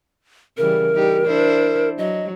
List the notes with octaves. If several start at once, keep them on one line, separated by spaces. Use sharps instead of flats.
C#3 E3 G3 A#4
G3 D#4 G4
D4 E4 C5
F#3 D#5